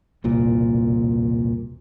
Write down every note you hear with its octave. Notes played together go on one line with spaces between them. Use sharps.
E1 C2 A#2